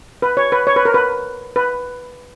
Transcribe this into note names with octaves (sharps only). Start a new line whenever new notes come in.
B4
C#5
B4
C#5
B4
A#4
B4
B4